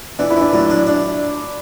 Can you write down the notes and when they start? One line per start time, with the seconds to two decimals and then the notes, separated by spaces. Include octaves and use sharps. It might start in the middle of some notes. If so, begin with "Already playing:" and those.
0.19 E3 D4
0.30 E4
0.36 E3
0.42 D4
0.53 A2 F#3
0.70 D4
0.87 D4